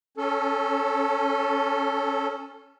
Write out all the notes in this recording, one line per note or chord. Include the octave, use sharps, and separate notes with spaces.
C#4 A4